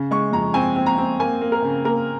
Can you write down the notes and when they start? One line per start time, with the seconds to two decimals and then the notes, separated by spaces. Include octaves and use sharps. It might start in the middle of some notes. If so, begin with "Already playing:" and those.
Already playing: C#3
0.11 G#3 C#6
0.32 F2 A#5
0.54 C4 G#5
0.76 C4
0.86 A#5
0.98 C4
1.19 A#3 G#5
1.41 A#3
1.52 A#4
1.62 C#3
1.84 A#3 A#4